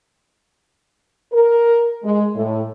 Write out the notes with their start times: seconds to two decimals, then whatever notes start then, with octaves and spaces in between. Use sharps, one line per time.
1.33 A#4
2.04 G#3
2.35 A2